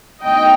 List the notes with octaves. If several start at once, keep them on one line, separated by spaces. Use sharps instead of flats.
D2 D3 G3 B3 D#4 D#5 G5